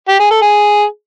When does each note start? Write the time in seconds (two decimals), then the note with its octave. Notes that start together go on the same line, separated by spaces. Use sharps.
0.08 G4
0.20 G#4
0.31 A4
0.42 G#4